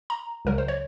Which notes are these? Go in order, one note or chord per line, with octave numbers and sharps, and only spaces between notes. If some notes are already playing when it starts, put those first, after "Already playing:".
A#5
C#2 C#3 F#3 A#4
C5
C#5